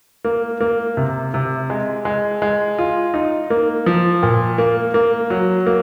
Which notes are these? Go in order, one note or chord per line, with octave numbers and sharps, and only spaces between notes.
A#3
A#3
C3
C3
G#3
G#3
G#3
F4
D#4
A#3
F3
A#2
A#3
A#3
F#3
A#3